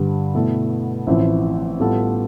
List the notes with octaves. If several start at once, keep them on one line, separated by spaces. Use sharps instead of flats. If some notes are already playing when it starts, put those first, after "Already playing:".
Already playing: G2 D3 G3
B2 A3 E4 A4
A1 A2 F3 C4 E4
A2 G3 B3 F4 A4